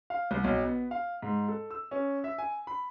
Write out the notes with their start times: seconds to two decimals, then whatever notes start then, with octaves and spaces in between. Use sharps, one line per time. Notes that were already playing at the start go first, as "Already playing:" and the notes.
0.10 F5
0.31 C2
0.44 B1
0.64 B3
0.91 F5
1.22 G#2
1.48 A4
1.71 E6
1.91 C#4
2.24 E5
2.38 G#5
2.67 B5